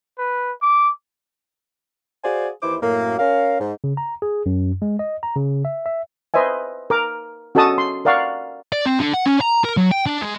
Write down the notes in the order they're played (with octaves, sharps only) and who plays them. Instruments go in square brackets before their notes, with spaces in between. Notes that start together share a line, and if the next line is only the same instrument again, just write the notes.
[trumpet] B4
D6
[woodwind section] F#4 G#4 C5 D5 F5 G#5
D#2 E3 E4 C5 D6
F#2 A2 A#3
C#4 A#4 F5
G#2
[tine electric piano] C#3
A#5
G#4
F#2
G#3
D#5
A#5
C#3
E5
E5
[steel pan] B4 C5 D#5 E5 G#5
A#4 D6
C#4 F#4 A4 D#5 A5 D#6
C6
A#4 D5 F5 F#5 C#6
[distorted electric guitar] D5
C4
D3
F#5
C#4
A#5
A#4
F#3
G5
D4
G#3